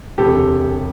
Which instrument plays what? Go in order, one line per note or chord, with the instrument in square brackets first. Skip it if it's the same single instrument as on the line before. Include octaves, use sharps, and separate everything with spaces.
[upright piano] E1 D2 C3 E3 A3 [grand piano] G4 A4